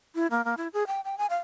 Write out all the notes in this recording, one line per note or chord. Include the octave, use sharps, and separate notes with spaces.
E4
A#3
A#3
E4
G#4
G5
G5
G#5
F5